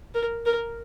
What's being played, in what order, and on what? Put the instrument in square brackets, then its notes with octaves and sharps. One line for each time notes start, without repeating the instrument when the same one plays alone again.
[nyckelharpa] A#4
A#4